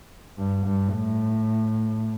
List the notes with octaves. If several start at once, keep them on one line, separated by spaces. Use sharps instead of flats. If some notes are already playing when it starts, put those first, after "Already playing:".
G2
G2
A2